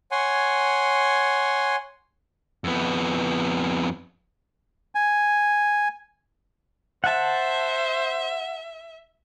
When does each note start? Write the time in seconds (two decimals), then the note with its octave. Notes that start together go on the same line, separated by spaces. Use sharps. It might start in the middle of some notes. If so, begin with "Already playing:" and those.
0.11 C#5 F#5 G#5 C6
2.64 F2 B3
4.95 G#5
7.04 C5 E5 F#5 A5